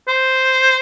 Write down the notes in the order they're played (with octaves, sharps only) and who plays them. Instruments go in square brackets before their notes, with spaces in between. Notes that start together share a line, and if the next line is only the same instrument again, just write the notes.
[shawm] C5